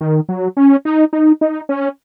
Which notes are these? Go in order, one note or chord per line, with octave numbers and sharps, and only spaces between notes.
D#3
F#3
C#4
D#4
D#4
D#4
C#4